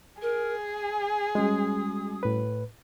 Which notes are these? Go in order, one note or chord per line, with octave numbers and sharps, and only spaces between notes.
G#4 A#4
G#5
G3 G#3 C#4 F#4 D#6
A2 B4